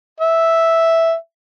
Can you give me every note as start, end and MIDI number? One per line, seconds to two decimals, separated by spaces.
0.20 1.14 76